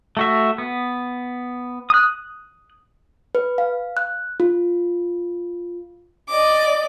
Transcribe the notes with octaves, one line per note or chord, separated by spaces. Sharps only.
A3 F#4 E5
B3
D#6 F#6
B4
F5
F#6
F4
D5 D#5 D6